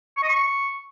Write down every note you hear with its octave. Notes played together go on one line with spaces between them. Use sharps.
C#6
D#5
C#6